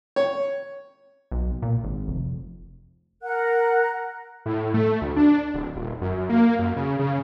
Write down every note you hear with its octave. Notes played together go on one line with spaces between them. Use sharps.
C#5
B1
A#2
G#1
F1
A#4 F#5 F#6
A2
A3
D2
D4
D1
D#1
F#2
A#3
F#2
C#3
C#3